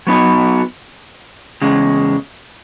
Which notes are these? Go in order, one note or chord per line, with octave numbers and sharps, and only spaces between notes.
F#3 B3 D#4 F#4
E2 C#3 G#3